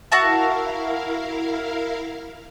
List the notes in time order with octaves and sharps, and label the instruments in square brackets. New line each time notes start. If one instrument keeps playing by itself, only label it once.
[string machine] E4 A#4 F5 [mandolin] F#4 E5 A5